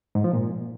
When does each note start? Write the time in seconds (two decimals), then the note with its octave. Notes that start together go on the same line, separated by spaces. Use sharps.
0.15 G#2
0.24 F3
0.33 A#2